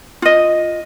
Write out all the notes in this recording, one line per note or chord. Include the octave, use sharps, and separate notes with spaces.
F4 D#5